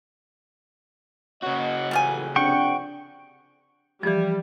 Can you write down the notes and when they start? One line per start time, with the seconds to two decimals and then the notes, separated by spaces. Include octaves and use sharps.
1.42 C#3 F#4 C#5 D#5
1.91 A1 A2 G3 F4 G#5
2.36 F2 C3 D4 F#5 G5 C#6
4.03 E3 F3 G3